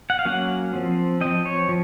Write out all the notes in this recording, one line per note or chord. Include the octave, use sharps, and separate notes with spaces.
F#5
F5
F#3 A#3 C#4 F#5
F3 C4
F3 C4 D#5
C#5
F3